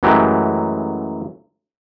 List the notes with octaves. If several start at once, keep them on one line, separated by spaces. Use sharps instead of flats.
F#2 E3 F#3 G#3 A3 G4